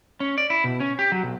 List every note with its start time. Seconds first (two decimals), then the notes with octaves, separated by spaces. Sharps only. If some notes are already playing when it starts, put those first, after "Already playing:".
0.20 C#4
0.38 D5
0.50 E4
0.64 B2
0.80 C#4
0.99 G4
1.12 F#3
1.23 B1